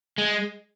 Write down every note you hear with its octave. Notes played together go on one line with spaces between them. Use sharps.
G#3